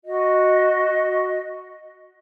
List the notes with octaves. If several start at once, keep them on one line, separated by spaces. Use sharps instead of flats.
F#4 D#5